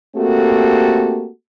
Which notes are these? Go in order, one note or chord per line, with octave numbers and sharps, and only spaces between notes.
A3 A#3 C4 F#4 G4 A4